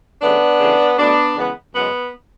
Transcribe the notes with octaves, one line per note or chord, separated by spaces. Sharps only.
C#3 F#3 A3 B3 D4
C#3 E3 A3
B2 A3 B3 D4
C#3 E3 G#3 B3
F#2 C#3 G#3 B3